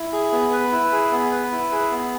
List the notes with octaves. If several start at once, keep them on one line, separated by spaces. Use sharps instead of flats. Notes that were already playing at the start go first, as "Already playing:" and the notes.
Already playing: E4
G#4
B3
B4
E4
G#4
B3
B4
E4
G#4
B3